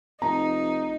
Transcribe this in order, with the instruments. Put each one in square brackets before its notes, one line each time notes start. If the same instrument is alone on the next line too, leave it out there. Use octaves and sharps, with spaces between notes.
[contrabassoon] F1 [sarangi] D#4 [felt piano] A#5